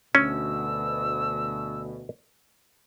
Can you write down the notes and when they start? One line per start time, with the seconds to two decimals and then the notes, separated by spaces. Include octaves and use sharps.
0.15 D2 B2 C#4 E6